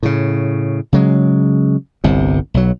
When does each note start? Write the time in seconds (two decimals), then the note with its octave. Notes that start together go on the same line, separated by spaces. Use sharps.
0.03 A2 C#3
0.93 C#3 F#3 G#3
2.04 G1 C2 C3
2.54 B1 F#3